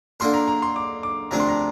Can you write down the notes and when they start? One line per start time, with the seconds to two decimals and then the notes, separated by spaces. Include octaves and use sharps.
0.20 D3 A#3 F4 A#4 C6
0.34 A#5
0.48 A#5
0.62 C6
0.76 D6
1.03 D6
1.31 D2 C3 F3 D4 A#5
1.40 C6
1.49 A#5